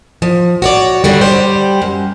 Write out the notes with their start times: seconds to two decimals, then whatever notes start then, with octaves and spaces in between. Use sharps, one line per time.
0.22 F3
0.62 F#4 C#5 D5
1.04 D3 D#3 G3
1.21 G3 G4 C5
1.82 F#2